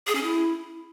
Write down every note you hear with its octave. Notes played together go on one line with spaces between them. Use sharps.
G#4
C#4
E4